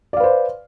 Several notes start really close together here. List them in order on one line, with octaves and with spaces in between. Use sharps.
D5 F5 B4 C5